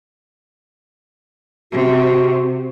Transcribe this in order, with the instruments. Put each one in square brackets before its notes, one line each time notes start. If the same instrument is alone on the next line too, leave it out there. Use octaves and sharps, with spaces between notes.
[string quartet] C3 [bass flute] F#4